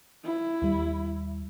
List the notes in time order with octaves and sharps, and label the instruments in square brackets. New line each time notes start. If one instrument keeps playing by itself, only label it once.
[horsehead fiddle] E4
[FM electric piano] D#2 G3